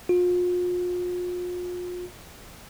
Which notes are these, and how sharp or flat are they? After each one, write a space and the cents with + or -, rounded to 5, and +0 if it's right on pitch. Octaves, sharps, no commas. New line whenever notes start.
F4 +40